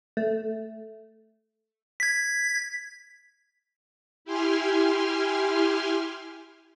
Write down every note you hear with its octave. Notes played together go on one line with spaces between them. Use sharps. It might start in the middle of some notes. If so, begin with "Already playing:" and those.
A3
G#6 B6
E4 G4 G#5 C6 F6